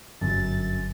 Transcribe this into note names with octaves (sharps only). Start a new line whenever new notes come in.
G1 F#2 A6